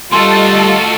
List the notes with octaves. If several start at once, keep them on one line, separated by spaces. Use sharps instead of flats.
G3 A3 F4 F#4 A4 D#5 C6